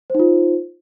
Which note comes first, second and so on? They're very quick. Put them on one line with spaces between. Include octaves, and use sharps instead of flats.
C5 D#4 F4